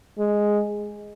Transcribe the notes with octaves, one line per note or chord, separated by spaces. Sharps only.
G#3